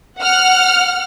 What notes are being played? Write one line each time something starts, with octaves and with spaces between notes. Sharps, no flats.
F#5 F6